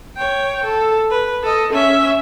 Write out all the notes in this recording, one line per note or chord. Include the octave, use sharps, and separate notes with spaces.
C#5 G5
A4
B4
A4 D#5
C#4 E5